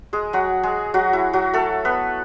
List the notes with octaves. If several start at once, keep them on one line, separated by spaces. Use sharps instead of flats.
G#3 G#4
F#3 F#4
G#3 G#4
F#3 F#4
E4
F#3 F#4
A3 A4
B3 B4